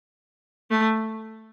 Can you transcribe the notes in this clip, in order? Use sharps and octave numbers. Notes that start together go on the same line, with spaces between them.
A3